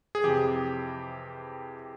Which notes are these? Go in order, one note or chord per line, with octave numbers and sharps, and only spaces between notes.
G#4
F2 C3 E3 G4